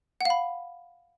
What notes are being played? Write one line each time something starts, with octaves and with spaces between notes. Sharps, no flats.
F5 F#5 B5